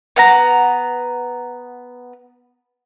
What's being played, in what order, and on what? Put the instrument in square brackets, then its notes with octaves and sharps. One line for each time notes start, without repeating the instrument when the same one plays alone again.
[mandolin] B3 F#5 A#5